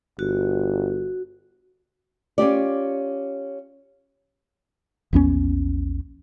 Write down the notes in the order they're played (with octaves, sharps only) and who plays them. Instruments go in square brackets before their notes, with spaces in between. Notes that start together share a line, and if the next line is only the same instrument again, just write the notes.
[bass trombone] G1 [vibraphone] F#4
[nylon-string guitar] C#4 F4 G4 D5
[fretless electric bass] A#1 E2 B3 C#4